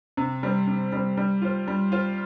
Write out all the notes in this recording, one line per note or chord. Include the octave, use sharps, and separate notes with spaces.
C3
G3 C4
C3
G3 C4
G3
F4 C5
G3
F4 C5